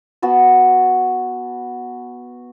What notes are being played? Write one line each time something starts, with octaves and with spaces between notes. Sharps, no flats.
B3 F#4 A5